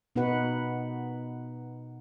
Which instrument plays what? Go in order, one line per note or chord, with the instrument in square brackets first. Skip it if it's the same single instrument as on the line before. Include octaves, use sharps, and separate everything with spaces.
[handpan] B2 B3 D#4 F#4 B4 F#5